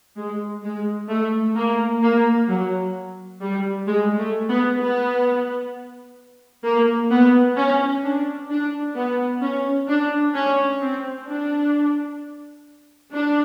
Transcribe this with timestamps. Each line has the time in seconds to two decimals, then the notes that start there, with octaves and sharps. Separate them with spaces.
0.17 G#3
0.63 G#3
1.09 A3
1.56 A#3
2.02 A#3
2.48 F#3
3.41 G3
3.87 G#3
4.18 A3
4.49 B3
4.80 B3
6.64 A#3
7.11 B3
7.57 C#4
8.04 D4
8.50 D4
8.95 B3
9.42 C#4
9.88 D4
10.35 C#4
10.81 C4
11.27 D4
13.13 D4